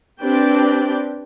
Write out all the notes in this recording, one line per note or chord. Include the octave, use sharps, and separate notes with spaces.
C4 D4 G4 B4 D5 G5